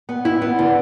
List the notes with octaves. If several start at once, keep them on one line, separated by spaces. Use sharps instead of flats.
B3
E4
B3
D3